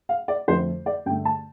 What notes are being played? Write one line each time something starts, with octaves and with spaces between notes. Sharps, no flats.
F5
D5
F2 D3 F3 A3 C5
D5
G2 D3 A3 G5
A5